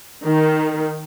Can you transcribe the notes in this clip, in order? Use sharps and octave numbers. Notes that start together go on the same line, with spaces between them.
D#3